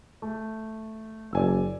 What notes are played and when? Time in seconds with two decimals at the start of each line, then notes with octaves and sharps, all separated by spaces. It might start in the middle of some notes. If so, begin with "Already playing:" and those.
0.22 A3
1.33 F#1 D5 G#5 E6